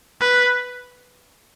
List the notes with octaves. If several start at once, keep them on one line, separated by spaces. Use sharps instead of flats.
B4